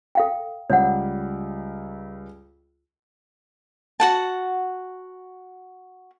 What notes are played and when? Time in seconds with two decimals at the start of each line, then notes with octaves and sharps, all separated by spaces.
0.15 A4 F5 G5
0.70 C#2 G3 C#5 F#5
4.00 F#4 F#5 A5